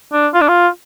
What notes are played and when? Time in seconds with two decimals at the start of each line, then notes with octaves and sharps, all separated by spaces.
0.13 D4
0.34 F4
0.41 D4
0.48 F4